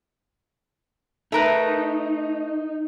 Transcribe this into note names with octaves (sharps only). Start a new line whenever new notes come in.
A3 D#4 A#4 B4